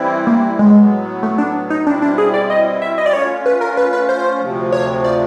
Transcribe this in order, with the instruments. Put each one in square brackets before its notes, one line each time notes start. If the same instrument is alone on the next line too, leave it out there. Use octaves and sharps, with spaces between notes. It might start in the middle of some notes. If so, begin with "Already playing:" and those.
Already playing: [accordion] E3 G3 C4 E4
[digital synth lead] A#3
[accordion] A2 F#3 B3 [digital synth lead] G#3
[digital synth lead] A3
D4
D#4
[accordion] B2 G3 C4 E4 [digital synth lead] D4
[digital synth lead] D4
G#4
D5
D#5
E5
D#5
D5
[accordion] A3 C#4 F4 [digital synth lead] C#5
[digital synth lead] B4
A#4
B4
B4
C5
[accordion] D2 C3 F3
[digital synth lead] C#5
D5